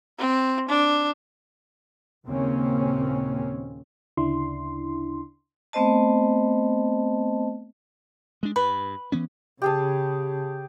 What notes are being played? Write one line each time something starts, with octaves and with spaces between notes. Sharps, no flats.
C4
D4
D#2 A#2 C#3 A#3 C4 C#4
D2 C#3 D4 E4 C6
A3 B3 C4 C5 D#5 A5
G#3 D4
G2 B4
E3 B3 C#4
C#3 G4 G#4 A5